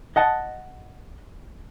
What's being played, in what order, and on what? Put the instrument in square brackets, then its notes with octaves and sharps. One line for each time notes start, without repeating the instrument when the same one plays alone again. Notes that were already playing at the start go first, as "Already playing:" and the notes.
[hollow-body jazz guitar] D#5 F#5 A5